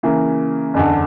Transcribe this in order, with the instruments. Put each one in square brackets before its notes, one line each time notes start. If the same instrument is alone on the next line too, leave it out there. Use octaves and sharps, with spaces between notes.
[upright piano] C#3 E3 A#3
F#1 E2 D3